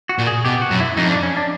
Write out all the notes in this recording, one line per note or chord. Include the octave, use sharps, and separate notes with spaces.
F#4
A#2
G#4
B2 G4
F#4
F#2
E4
F2 D#4
D4
C#4
D4